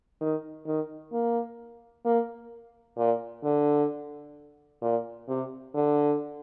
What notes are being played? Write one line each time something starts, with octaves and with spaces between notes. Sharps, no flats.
D#3
D#3
A#3
A#3
A#2
D3
A#2
C3
D3